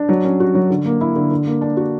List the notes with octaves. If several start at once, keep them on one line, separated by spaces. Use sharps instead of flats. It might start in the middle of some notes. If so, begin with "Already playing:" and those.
Already playing: D4
F#3
C#4
F#4
F#3
D3
A#3
E4
D3
D3
A#3
D4
F#4